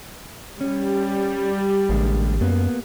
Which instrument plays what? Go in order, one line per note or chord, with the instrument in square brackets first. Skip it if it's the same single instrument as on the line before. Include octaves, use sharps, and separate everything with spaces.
[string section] G3 [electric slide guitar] C#4
[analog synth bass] A1 [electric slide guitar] D3 G#3 A#3
[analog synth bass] F#2 [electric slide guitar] A#3 B3